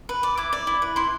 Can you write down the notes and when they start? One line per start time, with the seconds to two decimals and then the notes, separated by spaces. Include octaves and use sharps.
0.09 B4
0.23 D5
0.38 E4 D6
0.53 D5
0.67 E4
0.82 B4
0.96 E4 C6